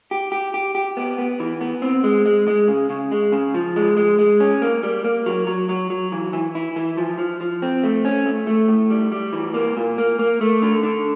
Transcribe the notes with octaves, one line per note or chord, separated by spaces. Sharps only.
G4
G4
G4
G4
B3
B3
E3
B3
C4
G#3
G#3
G#3
C#3
C#3
G#3
C#3
F3
G#3
G#3
G#3
C#4
A#3
G3
A#3
F#3
F#3
F#3
F#3
E3
E3
E4
E3
F3
F3
F3
C4
A3
C#4
A3
A3
A2
G3
G3
E3
A#3
A#2
A#3
A#3
A3
D3
D3